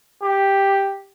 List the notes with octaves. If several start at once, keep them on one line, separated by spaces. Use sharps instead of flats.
G4